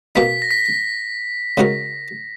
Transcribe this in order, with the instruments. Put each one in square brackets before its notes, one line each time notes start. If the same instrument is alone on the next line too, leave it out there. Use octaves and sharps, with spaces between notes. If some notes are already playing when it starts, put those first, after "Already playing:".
[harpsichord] B2 A#3 D#4 [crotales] B6
[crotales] A#6
B6
[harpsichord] C#3 G#3 D#4 F#4 A#4